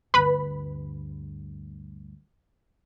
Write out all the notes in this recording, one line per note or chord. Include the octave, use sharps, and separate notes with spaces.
D2 G2 B4 B5